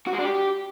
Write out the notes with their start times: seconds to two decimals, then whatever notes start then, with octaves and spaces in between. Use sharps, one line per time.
0.07 F#4
0.13 G#3
0.19 D4
0.25 G4